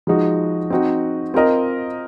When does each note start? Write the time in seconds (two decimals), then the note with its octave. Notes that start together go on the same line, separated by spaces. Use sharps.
0.07 F3 G#3 D#4 F#4
0.70 C4 D#4 F#4
1.34 C4 F4 A#4 D#5